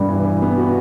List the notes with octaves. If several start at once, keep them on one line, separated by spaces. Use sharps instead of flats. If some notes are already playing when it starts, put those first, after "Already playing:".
Already playing: G2
E3
E3
B3
F#4